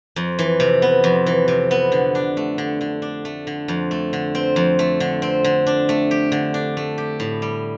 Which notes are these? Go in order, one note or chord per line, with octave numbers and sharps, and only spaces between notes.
F2
E3
C3
B3
F2
E3
C3
B3
D3
D4
A3
D3
D3
D4
A3
D3
F2
A3
D3
C4
F2
A3
D3
C4
D3
D4
A3
G4
D3
D4
A3
G4
A2
G3